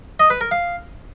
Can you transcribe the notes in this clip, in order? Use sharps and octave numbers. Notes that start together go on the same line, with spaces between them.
D#5
B4
A#4
F5